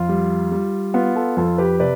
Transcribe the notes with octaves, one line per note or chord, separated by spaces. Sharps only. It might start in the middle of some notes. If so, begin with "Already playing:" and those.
Already playing: F2 F4
G3
G3
B3 F4
F4 A4
F2 F4 A4
G4 B4
C3 B4 D5